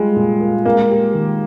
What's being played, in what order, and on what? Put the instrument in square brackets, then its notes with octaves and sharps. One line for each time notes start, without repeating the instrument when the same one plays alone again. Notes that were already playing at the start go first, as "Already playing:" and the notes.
Already playing: [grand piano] G3 F4 [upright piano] G#3
[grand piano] A#2
A#3
[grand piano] G#3 [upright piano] A#3
[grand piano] G4
D#3